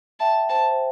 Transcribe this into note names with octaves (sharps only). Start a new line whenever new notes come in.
E5 G5 A5
C5 E5 A5
C5